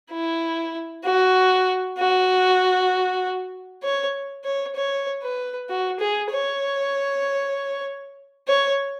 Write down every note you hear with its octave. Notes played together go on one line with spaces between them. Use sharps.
E4
F#4
F#4
C#5
C#5
C#5
B4
F#4
G#4
C#5
C#5